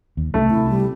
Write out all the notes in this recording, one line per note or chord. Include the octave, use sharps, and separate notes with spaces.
D#2
C2 A3
C3 E4
G3